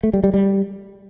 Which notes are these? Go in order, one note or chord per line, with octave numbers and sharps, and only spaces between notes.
A3
G3
G3
G3